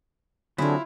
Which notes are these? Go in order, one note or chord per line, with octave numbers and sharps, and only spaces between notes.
D3 F#3 C4 E4 F4 G#4